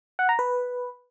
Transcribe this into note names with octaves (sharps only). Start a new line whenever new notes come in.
F#5
A#5
B4